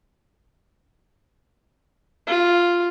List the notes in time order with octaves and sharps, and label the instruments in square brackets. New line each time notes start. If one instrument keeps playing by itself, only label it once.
[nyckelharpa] F4